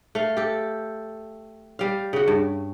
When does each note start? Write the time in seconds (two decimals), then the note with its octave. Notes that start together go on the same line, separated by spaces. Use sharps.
0.15 A3 F5
0.37 G4 A4
1.79 G3 F5
2.13 C#3 F#4
2.28 G2